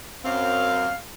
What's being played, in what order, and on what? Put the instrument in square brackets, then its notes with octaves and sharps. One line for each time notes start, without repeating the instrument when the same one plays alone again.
[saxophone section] F#2 C4 [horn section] F5